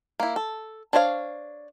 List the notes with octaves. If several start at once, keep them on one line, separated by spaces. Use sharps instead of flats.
A#3 E4
A4
D4 C5 C#5 D#5 F5